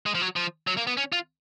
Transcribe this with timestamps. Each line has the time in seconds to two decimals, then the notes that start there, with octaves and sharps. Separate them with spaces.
0.06 G#3
0.15 F3
0.22 F#3
0.36 F3
0.67 F#3
0.77 A#3
0.87 B3
0.97 C#4
1.12 F4